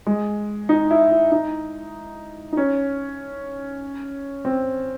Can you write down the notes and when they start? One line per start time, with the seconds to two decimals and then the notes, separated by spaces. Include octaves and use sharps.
0.07 G#3
0.69 D#4
0.91 E4
1.11 E4
1.32 D#4
2.53 D#4
2.57 C#4
4.45 C4